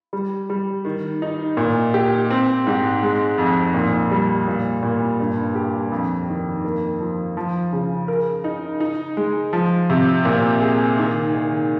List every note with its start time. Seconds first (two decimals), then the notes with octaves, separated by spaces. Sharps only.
0.13 G3
0.50 G3
0.85 D#3
1.22 D#4
1.57 A#2
1.94 G4
2.30 C4
2.67 G#2
3.03 G#3
3.38 F2
3.74 A#2
4.11 G3
4.48 A#2
4.83 A#2
5.20 G2
5.55 G4
5.92 F2
6.28 D#3
6.64 A#3
7.00 F3
7.37 F3
7.73 C#3
8.08 A#4
8.44 D#4
8.80 D#4
9.17 G#3
9.53 F3
9.90 C3
10.25 A#2
10.62 G#4
10.97 D#3
11.34 D#3